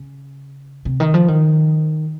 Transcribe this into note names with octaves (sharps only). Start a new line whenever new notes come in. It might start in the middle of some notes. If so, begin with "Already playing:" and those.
Already playing: C#3
C3
D#3
F3
D#3